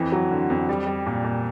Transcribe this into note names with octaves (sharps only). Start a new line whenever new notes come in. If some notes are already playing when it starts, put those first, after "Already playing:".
Already playing: F2 E3
F#3
D3
F2
G3
G3
A#2
A#2